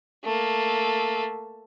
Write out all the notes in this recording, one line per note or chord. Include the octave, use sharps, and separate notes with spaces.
A3 A#3